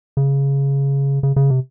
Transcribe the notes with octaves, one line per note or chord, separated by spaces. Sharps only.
C#3
C#3
C#3
C3